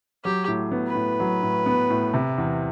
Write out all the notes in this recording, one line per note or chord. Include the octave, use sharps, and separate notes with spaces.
F#3 G4
A2
B3
B4
A2
F#3
A2
B3
A2
C3
E2